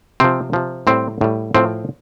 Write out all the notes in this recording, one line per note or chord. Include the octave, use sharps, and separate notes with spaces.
C3 F3 C4
C3 F3
A2 G3 C4
A2 G3
A2 F3 C4